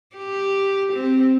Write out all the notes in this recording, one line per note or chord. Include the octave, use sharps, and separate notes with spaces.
G4
C4